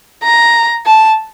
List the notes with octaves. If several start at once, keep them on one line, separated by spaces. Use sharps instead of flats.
A#5
A5